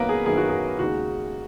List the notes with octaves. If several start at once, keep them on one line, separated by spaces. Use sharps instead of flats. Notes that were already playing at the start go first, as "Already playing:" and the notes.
Already playing: F#2 D#3 F#3 A#3 B3 A#4 B4
G#4
F#2 D#3 F#3 B3 G#4
F#4
G#4
D#2 C#3 G#3 D#4 F#4